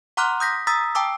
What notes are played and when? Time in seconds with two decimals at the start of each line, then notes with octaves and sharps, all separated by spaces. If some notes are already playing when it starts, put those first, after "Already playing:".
0.17 F#5 A#5 C6 D6 F6 F#6
0.40 D#6 G6 A#6 B6
0.67 A#5 D#6 E6 A6 B6
0.95 G5 A5 D6 E6